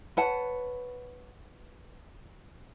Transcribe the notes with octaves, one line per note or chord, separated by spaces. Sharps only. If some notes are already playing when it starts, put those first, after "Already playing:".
B4 C#5 F#5 A5